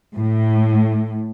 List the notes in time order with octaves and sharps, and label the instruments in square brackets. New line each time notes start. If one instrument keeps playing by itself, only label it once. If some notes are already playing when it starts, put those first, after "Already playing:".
[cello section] A2